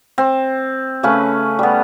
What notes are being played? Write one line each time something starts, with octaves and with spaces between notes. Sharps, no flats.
C4
C#3 A3 C#4 B4
G3 B3